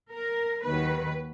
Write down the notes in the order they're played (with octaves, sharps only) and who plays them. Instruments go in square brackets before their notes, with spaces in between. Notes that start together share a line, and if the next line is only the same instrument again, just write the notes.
[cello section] A#4
D#2 D#3 F#3 B4